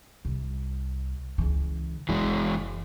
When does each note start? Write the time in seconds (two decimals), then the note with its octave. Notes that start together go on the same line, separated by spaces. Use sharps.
0.25 C2
1.38 C#2 E3
2.09 F#1 E3 G#3